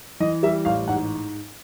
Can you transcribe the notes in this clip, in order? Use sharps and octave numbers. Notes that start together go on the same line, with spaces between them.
E3 D#5
G3 E5
A1 F5
G#2 F#5